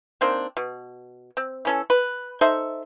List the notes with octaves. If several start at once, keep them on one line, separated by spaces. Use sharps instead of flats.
D#3 A#3 C4 D4
B2
C4
E3 C#4 A4
B4
D#4 A4 C5 E5